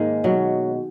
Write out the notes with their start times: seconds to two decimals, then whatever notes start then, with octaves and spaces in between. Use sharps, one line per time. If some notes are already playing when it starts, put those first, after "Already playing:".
Already playing: G#2 D#3 G#3 A#3
0.24 B2 F#3